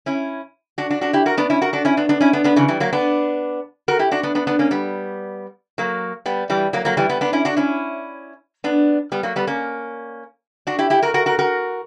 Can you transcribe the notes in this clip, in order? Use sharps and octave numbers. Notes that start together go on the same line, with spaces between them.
C#4 E4
D4 F#4
D4 F#4
D4 F#4
E4 G4
F#4 A#4
B3 D4
C#4 E4
F#4 A#4
D4 F#4
C#4 E4
B3 D4
B3 D4
C#4 E4
B3 D4
B3 D4
C#3 E3
E3 G3
F#3 A#3
B3 D4
F#4 A#4
E4 G4
D4 F#4
B3 D4
B3 D4
B3 D4
A#3 C#4
G3 B3
F#3 A#3
G3 B3
E3 G3
F#3 A#3
F#3 A#3
E3 G3
G3 B3
B3 D4
C#4 E4
D4 F#4
C#4 E4
B3 D4
G3 B3
F#3 A#3
G3 B3
A#3 C#4
D4 F#4
E4 G4
E4 G4
F#4 A#4
F#4 A#4
F#4 A#4
F#4 A#4